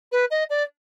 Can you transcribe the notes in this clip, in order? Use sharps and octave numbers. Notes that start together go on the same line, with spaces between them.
B4
D#5
D5